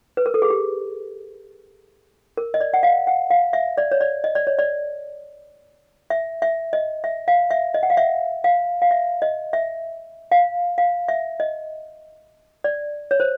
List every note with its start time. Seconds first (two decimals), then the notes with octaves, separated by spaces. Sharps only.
0.17 B4
0.26 A#4
0.34 A4
0.42 G#4
0.50 G4
2.37 A#4
2.54 D#5
2.61 D5
2.74 F#5
2.83 F5
3.07 F#5
3.31 F5
3.53 E5
3.78 D5
3.92 C#5
4.01 D5
4.24 D#5
4.35 D5
4.47 C#5
4.59 D5
6.10 E5
6.42 E5
6.73 D#5
7.04 E5
7.28 F5
7.51 E5
7.74 D#5
7.83 F#5
7.90 F5
7.97 E5
8.44 F5
8.82 F5
8.91 E5
9.22 D#5
9.53 E5
10.32 F5
10.78 F5
11.08 E5
11.40 D#5
12.64 D5
13.11 C#5
13.20 C5